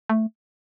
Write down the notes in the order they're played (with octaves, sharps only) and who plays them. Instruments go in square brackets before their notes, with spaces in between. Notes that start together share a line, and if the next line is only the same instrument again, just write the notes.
[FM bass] A3